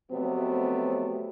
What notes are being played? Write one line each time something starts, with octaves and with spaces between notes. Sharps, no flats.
F2 C3 F#3 A3 B3